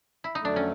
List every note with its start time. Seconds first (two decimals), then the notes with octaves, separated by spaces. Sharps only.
0.24 E4
0.35 D#4
0.40 F2 D3 F#3 A3 D4
0.56 C#4